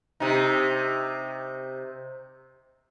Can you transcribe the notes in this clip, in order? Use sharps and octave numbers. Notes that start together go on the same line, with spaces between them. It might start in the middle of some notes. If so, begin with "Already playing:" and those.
C3 D#4